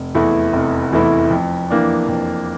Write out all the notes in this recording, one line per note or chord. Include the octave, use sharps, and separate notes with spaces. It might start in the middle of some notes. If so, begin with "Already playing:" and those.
Already playing: F1
E2 E3 A3 E4
F1
E2 E3 A3 E4
F2
E3 A#3 D4
F2